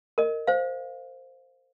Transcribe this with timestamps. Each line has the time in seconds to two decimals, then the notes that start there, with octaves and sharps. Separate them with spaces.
0.18 A#4 D#5
0.47 C5 F5